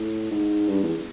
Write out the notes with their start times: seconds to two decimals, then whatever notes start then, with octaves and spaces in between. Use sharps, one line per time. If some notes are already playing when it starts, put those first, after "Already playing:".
Already playing: A2
0.31 G#2
0.68 G2
0.83 E2